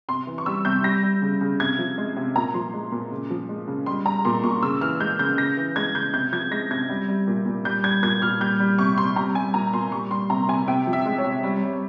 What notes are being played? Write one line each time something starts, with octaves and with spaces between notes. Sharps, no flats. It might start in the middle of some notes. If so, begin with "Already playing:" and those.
C3 C6
E3
C#6
G3 E6
C3 G6
G3 A#6
G3
C#3
C#3
C3 G#6
F3
G#3
C3
A#2 A#5
F3 C6
G#3
A#2
C#3
F3
G#3
C#3
G3 C6
G3 A#5
A#2 C6
A#2 C#6
C#3 E6
E3 F6
G#3 G6
C#3 G6
C#3 A#6
E3
G#3 G#6
C#3 G6
C3 G6
F3 G#6
G#3 A#6
C3 G#6
G3
G3
A#2
A#2
G3 G6
G3 G#6
A#2 G#6
A#2 F6
G3 G6
G3
C3 C#6
C3 C6
G3 A#5
G3 G#5
A#2 A#5
A#2 C6
G3 C#6
G3 C6
C3 A#5
C3 G#5
C3 G5
F3
E5
G#3
C#5
C3
G3
G3